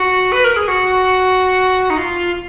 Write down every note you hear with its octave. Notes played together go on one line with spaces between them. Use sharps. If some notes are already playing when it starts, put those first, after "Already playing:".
Already playing: F#4
B4
A#4
G#4
F#4
D#4
F4